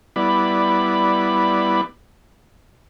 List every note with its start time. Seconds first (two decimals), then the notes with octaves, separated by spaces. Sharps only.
0.16 G3 B3 E4 D5 B5